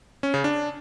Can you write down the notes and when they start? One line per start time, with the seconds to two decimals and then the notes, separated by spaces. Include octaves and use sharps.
0.23 C#4
0.34 C#3
0.44 D4